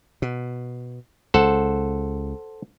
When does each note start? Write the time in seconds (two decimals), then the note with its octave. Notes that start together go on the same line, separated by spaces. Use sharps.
0.22 B2
1.34 C#2 A4 C5 F#5